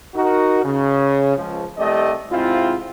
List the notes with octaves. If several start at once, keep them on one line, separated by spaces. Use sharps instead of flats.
D#4 F#4 A#4
C#3
C#2 F3
C2 A3 G4 D5 D#5
G#2 C3 C4 E4 F4